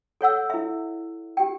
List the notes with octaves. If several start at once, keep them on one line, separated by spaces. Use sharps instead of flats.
A4 C#5 F#5 E6
E4 E5
G4 G5